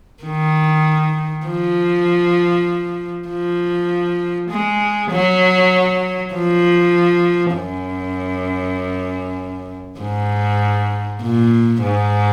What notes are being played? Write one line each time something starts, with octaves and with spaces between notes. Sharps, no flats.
D#3
F3
F3
G#3
F#3
F3
F#2
G#2
A#2
G#2